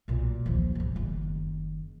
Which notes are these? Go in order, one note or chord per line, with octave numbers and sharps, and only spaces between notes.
B1 A#2
D#2 F3
G#2 C#3
F#1 D#3